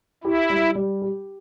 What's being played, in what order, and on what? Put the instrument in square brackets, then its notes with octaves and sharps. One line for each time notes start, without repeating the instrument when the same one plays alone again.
[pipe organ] E4 [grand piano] G4
[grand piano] G3
G3
G4